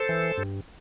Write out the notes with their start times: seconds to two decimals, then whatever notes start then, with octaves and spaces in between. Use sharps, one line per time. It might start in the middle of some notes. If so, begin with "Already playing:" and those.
Already playing: A4 C5
0.09 E3
0.37 G2